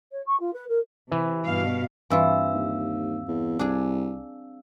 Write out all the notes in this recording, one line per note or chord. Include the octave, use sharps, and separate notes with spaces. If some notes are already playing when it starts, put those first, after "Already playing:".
C#5
C#6
F4
B4
A#4
C3 E3
G2 B2 F5
G2 E3 C4 F4 F5 E6
D#2
E2
C2 D4 G#4